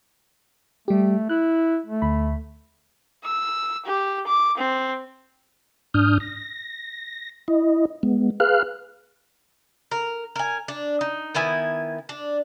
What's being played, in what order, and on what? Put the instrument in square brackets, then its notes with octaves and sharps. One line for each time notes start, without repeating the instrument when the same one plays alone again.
[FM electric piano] G3 G4 [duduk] A3
[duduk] E4 [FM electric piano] F#6
[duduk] A3
[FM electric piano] D2 B5
[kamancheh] E6
G4
D6
C4
[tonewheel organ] G#2 D4 D#6 F6 G6
A#6
E4 D#5
G#3 B3
G#4 B4 F5 F6 F#6
[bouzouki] A#4
A#4 G#5
D4
D#4
D#3 B3 E4 G#5
D4